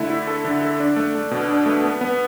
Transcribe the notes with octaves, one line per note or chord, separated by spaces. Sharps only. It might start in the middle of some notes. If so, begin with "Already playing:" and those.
Already playing: D3 A3 E4
E4
A4
D3
A4
D4
A3
A3
B2
D4
A3
B3
B3